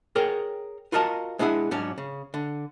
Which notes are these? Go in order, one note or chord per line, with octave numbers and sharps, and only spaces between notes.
G#4 A#4 C#5 G5
F4 F#4 A#4 D#5 F5 A5
G#3 D4 E4 G#4 F#5
G#2 F#3 C#4 D4
C#3
D3